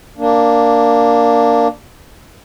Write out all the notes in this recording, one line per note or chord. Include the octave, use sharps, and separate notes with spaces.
A#3 D4